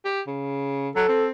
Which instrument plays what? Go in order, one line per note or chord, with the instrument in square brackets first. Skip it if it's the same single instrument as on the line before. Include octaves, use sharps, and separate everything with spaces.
[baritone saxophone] G4
C#3
[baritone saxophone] F#3 [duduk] A4
[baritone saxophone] C4